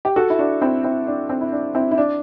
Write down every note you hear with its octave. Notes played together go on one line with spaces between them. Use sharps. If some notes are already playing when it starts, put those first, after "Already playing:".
G4
F#4 A4
E4
D4 F#4
C4 E4
C4 E4
D4
C4
E4
D4
C4 E4
E4
D4